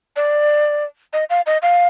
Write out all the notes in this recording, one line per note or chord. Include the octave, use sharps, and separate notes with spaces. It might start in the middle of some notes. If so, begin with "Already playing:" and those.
D5
D#5
F5
D#5
F5